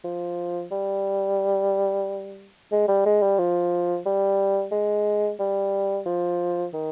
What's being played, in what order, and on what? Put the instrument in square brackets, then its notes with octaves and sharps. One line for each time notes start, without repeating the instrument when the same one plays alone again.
[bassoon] F3
G3
G#3
G3
G#3
G3
F3
G3
G#3
G3
F3
D#3